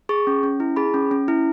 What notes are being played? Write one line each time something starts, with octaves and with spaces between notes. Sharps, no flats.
G#4 C#6
C#4
C#4
E4
G#4 B5
C#4
C#4
E4